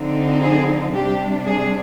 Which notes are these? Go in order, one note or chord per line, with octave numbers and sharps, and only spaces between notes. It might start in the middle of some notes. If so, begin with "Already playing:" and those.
Already playing: D3 F3 C4 D#4
G#4
C3 G3 D4 G4
G#4